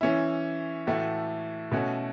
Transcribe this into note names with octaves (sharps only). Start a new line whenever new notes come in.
E3 C#4 E4
A2 E3 A3 F#4
B2 A3 C#4 F#4